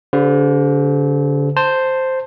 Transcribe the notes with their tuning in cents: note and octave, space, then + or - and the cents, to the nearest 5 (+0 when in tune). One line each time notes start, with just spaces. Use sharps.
D3 -40 G4 +0 C5 -35
C5 +0 A5 +20